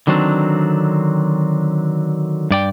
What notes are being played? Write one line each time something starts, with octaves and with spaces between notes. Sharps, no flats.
D3 D#3 F#3 C4 D4
G2 D5 G5